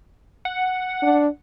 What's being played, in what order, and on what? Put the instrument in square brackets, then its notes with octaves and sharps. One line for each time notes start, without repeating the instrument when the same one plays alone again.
[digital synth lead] F#5
[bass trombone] D4